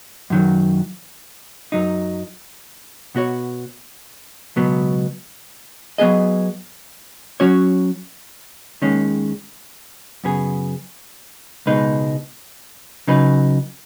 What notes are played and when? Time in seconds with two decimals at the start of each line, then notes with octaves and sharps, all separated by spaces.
0.30 F#2 D#3 F#3
1.72 F#2 F#3 D#4
3.15 B2 B3 F#4 C#5
4.56 C#2 B2 F#3 B3
5.98 F#3 B3 G#4 D#5
7.40 F#3 C#4 F#4 C#5
8.82 D#2 D#3 G#3 C#4
10.24 F#2 C#3 B3 G#4
11.66 C#2 B2 G#3 D#4 B4
13.08 C#3 F#3 D#4 B4